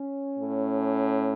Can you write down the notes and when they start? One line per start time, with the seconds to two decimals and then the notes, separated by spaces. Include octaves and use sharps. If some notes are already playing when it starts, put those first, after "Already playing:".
Already playing: C#4
0.39 A2